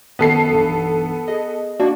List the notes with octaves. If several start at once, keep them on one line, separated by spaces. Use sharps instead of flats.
F#2 D#3 F3 B3 A4 C7
B1 G2 E3
G#4 D#5
A#3 D4 F#4